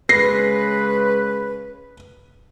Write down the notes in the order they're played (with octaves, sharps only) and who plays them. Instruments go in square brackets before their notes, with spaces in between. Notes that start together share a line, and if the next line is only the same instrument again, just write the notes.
[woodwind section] C#3 G#3 B4 [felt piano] A#6 C7